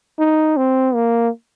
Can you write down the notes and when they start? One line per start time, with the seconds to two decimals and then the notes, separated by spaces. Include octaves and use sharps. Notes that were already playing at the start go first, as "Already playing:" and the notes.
0.19 D#4
0.57 C4
0.95 A#3